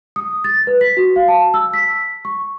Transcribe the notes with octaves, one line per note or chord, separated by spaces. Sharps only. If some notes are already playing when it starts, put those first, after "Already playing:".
D#6
A6
B4
B6
F#4
F5
A5
E6
B6
C#6